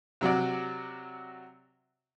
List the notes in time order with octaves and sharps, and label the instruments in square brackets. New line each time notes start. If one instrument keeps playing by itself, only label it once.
[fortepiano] C3 F#3 F#4 D5